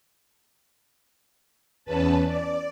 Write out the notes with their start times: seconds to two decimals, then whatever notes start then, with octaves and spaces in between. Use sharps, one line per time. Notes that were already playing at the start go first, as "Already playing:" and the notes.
1.85 E2 C#4 B4 A5
2.26 D5